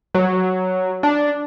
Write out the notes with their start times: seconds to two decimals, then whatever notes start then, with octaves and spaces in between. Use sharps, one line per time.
0.14 F#3
1.03 D4